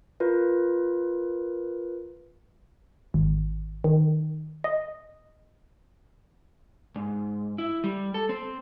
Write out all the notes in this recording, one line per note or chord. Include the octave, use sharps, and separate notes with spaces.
F4 A#4 B4
G#1
D#3
D#5
G#2
E4
G3
A4
C4